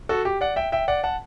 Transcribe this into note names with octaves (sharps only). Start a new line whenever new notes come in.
F#4 A4
G4
D5 F#5
E5 G5
E5 G5
D5 F#5
F#5 A5